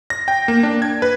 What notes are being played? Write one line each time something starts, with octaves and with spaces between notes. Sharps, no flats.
A#6
G5
A#3
D4
G#6
B4